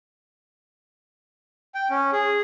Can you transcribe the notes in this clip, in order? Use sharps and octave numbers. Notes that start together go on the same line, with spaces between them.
G5
C#4
G#4